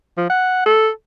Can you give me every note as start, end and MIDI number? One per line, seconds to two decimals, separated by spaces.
0.17 0.26 53
0.29 0.63 78
0.66 0.89 69